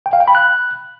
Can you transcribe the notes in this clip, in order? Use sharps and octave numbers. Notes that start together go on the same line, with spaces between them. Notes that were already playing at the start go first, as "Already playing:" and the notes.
G5
F5
G5
B5
F#6